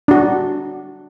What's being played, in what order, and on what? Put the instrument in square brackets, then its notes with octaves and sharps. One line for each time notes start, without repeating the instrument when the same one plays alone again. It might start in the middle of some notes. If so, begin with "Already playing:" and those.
[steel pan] D4 F#4